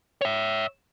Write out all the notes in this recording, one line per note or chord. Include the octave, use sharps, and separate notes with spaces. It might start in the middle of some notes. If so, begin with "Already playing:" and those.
C#5 E5